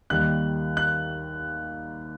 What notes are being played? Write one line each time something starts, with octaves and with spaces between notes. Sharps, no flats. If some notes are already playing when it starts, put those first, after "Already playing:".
D#2 D#3 G3 F#6
F#6